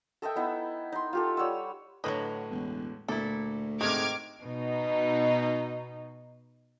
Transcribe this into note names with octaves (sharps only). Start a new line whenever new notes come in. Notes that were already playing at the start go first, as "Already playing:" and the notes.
A4 D#5 E5 G5
B3 D#4 E4
D#4 C6
F4 G4 A4
G3 C#5 F#5 E6
A2 D3 F#3 C#4 B4 D#5
E1
D2 A#2 E4 A4
G#2 C3 D#3 A3 D6 F6 G#6
B2 D#4